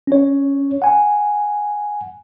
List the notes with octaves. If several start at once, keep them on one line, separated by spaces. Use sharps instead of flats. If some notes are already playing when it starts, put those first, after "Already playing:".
C#4 C#5
F#5 G#5